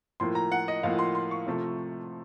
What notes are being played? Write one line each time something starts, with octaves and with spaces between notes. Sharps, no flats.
A2 F3 A#3 C6
A#5
F#5
D#5
A2 F3 A#3 F5
C6
C6
C#6
C3 F3 A3